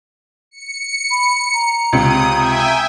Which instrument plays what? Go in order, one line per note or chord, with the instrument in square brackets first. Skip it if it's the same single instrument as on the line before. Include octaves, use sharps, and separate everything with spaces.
[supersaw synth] C#7
[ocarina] B5
A#5
[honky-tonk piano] C#2 C3 [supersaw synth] D#6
[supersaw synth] E5 G5 G#5